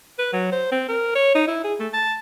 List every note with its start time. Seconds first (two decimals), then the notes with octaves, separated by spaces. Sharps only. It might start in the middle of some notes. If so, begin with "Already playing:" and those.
0.19 B4
0.33 F#3
0.52 C5
0.72 C4
0.89 A#4
1.15 C#5
1.35 D#4
1.48 E4
1.64 G#4
1.80 A3
1.93 A5